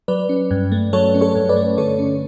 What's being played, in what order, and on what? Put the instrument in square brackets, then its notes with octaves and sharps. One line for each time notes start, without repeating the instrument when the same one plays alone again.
[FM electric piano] F#3 B4 D5
C#4
G2
A3
F#3 A4 C#5
C#4
A4 C#5
G2
B4 D5
A3
D3 A4 C#5
C#4